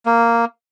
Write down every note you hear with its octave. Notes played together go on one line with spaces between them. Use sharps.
A#3